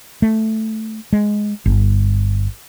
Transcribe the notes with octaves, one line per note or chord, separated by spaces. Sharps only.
A3
G#3
G1